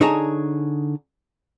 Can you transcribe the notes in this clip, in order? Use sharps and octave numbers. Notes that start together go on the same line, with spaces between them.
D3 D#4 G#4 C#5 A5 A#5